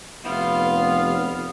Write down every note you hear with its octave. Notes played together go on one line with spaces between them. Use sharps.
F1 B3 F4